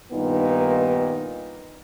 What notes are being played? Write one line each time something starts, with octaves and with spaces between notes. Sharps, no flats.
G2 A#2 D#3 B3 D#4